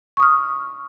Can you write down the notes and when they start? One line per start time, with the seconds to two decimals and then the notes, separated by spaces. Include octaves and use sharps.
0.17 C#6
0.20 D#6
0.22 F6